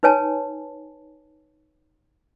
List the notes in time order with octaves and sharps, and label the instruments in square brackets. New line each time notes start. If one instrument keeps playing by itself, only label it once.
[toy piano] D#4 B4 C#5 G#5 A5